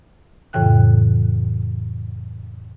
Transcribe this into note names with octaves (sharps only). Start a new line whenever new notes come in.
F2 A2 C#3 E3 G5 F#6